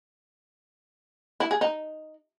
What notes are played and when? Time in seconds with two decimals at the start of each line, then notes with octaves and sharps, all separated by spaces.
1.40 E4
1.51 G#4
1.61 D#4